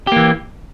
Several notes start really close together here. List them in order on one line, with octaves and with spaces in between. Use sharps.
G4 A#3 E3